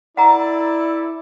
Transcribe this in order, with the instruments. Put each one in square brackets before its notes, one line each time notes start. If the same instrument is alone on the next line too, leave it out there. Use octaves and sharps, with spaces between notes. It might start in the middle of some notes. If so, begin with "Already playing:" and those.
[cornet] E4 [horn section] A4 D5 [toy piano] F#5 A#5